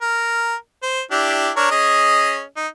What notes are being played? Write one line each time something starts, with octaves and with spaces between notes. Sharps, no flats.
A#4
C5
D4 E4 G4
D4 A#4 C#5
C#4 G#4 D#5
D#4